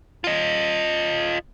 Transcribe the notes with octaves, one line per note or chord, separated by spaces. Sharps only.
F4 D#5